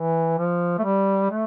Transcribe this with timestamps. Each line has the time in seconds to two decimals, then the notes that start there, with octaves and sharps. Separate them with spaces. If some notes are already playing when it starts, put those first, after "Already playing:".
Already playing: E3
0.39 F3
0.79 A3
0.84 G3
1.31 A3